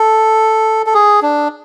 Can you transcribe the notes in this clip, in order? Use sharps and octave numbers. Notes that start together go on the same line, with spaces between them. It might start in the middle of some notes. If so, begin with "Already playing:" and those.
Already playing: A4
A4
G#4
D4